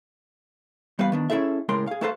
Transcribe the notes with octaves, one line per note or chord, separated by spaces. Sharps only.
E2 G3 B3 B4 F5
D#3 B3 D4
C#4 E4 G#4 A4 E5
C#2 A2 G#3 A#4 G5 C6
G#4 F5
A3 F#4 A4 B4 C5 F5